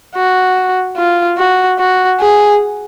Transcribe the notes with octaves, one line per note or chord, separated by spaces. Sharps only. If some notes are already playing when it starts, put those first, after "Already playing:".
F#4
F4
F#4
F#4
G#4